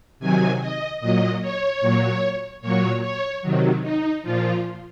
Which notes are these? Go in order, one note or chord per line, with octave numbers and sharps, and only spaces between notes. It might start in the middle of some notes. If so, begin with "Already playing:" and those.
C3 D#3 F#3 G#5
D#5
A#2 F#3 D#5
C#5
A#2 F#3
A#2 F#3 C#5
C#5
C3 D#3 F#3
D#4
A#2 F3 F4